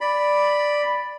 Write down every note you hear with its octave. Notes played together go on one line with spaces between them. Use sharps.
D5 B5